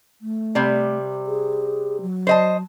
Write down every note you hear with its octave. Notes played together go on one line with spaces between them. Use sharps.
A3
C3 G3
G#4
F#3
C5 D#5 A5